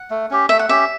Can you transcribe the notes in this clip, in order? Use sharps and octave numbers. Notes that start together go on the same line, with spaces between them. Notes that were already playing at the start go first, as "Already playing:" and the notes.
Already playing: F#5
A3
C#4 G4
A3 E5
F#5
C#4 G4 E5